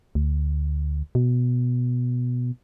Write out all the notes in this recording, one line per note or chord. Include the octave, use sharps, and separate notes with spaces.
D2
B2